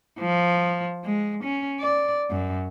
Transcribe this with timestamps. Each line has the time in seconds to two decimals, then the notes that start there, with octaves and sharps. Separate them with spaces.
0.19 F3
1.04 G#3
1.44 C#4
1.80 D5
2.31 F#2